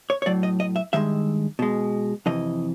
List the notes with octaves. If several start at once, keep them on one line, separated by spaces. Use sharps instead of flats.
C#5
C#5
A2 F#3 D5
D#5
D#5
E5
G2 D#3 G#3 E5
B2 G#3
F2 C3 E3 D#5